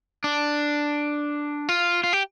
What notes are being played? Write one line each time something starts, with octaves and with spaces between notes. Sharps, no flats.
D4
F4
F4
G4